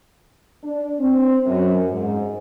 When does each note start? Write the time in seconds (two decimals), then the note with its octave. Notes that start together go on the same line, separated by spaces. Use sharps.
0.64 D4
1.00 C4
1.46 F#2
1.90 G#2